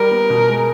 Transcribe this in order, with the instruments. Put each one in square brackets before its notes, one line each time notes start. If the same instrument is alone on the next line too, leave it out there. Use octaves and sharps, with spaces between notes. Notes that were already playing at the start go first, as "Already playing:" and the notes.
Already playing: [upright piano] G3 [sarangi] A#4
[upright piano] B3
B2
G#3